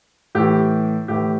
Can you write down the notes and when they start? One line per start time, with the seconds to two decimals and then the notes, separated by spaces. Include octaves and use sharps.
0.35 A2 E3 G4
1.08 A2 E3 G4